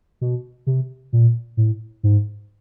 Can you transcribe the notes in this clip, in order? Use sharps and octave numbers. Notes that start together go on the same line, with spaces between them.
B2
C3
A#2
A2
G#2